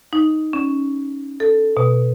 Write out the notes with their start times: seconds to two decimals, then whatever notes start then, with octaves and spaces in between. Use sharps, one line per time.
0.13 D#4
0.53 C#4
1.40 A4
1.77 B2